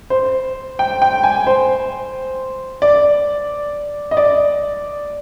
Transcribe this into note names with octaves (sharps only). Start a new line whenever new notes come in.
C5
G5
G5
G#5
C5
D5
D#5
D5